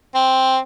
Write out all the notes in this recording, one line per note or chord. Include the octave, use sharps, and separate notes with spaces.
C4